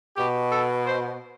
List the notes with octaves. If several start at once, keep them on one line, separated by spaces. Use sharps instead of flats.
B2 G4
A4
C5